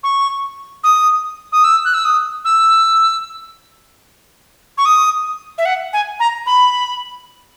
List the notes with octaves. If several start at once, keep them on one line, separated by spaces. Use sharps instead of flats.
C#6
D#6
D#6
E6
F#6
E6
D#6
E6
C#6
D#6
E5
F#5
G#5
A#5
B5